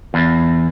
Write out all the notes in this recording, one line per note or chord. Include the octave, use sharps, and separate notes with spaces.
E2